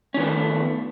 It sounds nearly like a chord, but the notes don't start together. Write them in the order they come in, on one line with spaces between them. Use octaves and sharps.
C#4 D#3 B3 F3 A3